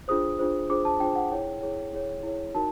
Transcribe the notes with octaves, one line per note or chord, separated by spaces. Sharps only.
D4 F4 G#4 C5 D#6
D4 F4 G#4 C5
D4 F4 G#4 C5 D6
A5
D4 F4 G#4 C5 G5
F#5
E4 G#4 C#5 G5
E4 G#4 C#5
E4 G#4 C#5
E4 G#4 C#5
D#4 F#4 A#4 A5